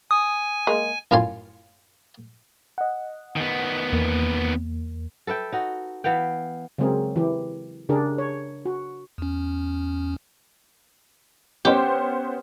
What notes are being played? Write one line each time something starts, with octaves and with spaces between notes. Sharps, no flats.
G#5 D#6
G#3 A#3
F#2 A2 C#4 F4 G#5 C6
D#5 F#5
D#3 B3
E2 A#3
A4 B4 E5 G5
D#4 F#4
E3 B3 F5 G5
C#3 F#3 G#3 C4 G#4 A#4
E3 G4
C#3 D4 G4 G#4 A#4
C#5
F#4
E2 C#4
B3 C#4 G4 C5